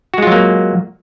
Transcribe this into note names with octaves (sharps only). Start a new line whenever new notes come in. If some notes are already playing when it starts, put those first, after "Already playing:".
F#3 G#3 A#3 F4 F#4